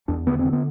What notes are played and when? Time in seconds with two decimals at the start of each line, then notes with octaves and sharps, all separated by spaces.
0.08 E2 D4
0.26 D3 B3
0.39 D3 C4
0.53 B3